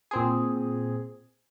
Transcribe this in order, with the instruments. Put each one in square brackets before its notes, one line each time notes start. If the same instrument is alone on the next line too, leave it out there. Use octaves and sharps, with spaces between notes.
[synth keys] A#2 C4 G#4